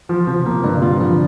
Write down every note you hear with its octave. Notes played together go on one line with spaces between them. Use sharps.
F3
C3 F3 C4
C3 A#3 C4
G2 D3 D4
A#2 A#3 F4
D3 F3 D4